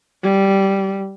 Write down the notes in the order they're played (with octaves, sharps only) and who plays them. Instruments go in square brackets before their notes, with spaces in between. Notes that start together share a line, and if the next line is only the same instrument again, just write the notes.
[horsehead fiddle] G3